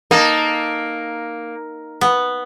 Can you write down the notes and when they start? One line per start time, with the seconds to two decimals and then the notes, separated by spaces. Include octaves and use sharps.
0.11 A#3 D#4 A4
2.01 B3